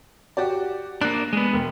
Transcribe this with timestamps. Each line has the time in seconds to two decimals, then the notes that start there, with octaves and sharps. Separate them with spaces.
0.37 F#4 G4 D5
1.01 A#3 D4 F#6
1.33 G#3 B3
1.53 E1